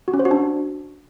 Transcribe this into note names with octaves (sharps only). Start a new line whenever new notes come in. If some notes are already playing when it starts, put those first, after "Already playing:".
F#4
C#4
C5
F#4
D4